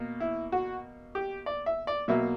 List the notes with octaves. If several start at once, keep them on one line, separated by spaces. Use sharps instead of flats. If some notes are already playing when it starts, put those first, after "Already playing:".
Already playing: B2 A#3
E4
F#4
G4
D5
E5
D5
B2 F#3 A#3 E5